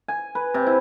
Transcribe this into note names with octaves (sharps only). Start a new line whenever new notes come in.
G#5
B4
C3
E4